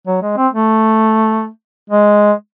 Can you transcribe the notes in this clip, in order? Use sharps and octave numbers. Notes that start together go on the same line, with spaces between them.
F#3
G#3
C4
A3
G#3